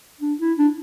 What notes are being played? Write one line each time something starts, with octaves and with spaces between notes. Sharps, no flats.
D4
E4
D4